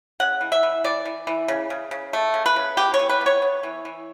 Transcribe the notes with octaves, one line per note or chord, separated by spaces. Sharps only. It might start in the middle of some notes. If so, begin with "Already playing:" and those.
C#3 F#5
E3
E5
E3
E3 D5
E3
E3
C#3
C#3
C#3
A3
C#3
B4
C#3
B3 G4
C#5
E3
B4
B3
C#5
B3
E3
E3